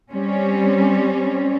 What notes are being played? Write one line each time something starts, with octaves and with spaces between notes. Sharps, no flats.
G3 C4 C#4